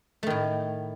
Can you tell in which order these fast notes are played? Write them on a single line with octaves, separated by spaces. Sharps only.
A3 D#3 A2